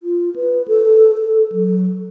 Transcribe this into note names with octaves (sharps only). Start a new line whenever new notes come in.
F4
B4
A4
A4
F#3